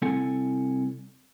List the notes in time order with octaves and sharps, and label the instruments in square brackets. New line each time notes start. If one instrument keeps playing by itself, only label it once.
[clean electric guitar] C2 C4 E4 A4 F#5 G#5